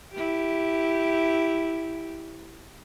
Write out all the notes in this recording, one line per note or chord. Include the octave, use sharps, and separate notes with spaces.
E4 G4